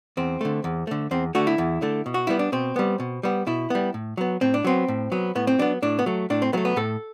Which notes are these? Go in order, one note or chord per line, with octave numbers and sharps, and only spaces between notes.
E2 C4
D3 A3
E2
D3 A3
E2 C4
D3 A3 F#4
E4
E2
D3 A3
B2
F#4
G3 B3 E4
D4
B2 C4
G3 B3
B2
G3 B3
B2 E4
G3 B3
A2
F#3 B3
A2 C4
D4
F#3 B3 C4
A2
F#3 B3
A2 B3
C4
F#3 B3 D4
A2 D4
B3
F#3 A3
A2 D4
C4
F#3 A3 B3
B3
A2 A4